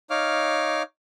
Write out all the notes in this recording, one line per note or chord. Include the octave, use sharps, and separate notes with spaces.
D#4 C#5 F5 D6 F6